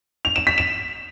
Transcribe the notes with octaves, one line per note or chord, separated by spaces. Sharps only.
F7
E7
B6
E7